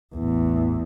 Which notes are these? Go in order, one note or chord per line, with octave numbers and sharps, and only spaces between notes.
A1 E2